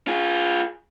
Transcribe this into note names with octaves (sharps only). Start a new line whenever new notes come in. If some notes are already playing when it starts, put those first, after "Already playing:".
F4 G#4